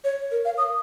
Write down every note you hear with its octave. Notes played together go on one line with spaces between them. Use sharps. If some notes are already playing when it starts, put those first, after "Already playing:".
C#5
A#4
F5
D#6